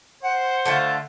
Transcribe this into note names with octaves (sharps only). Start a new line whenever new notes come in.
C5 F#5
D3 A3 F4 A5